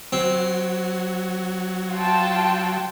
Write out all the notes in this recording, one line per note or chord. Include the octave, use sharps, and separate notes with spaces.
F#3 C4
F4 G5 A5